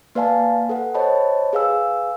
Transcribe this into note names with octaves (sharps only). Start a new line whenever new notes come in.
A#3 B4 D5 F5 G#5 A5
A4 B4 F#5
C5 C#5 D#5 A5 B5
G#4 B4 F5 G#5 E6